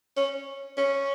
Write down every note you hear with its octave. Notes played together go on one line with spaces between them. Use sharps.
C#4
C#4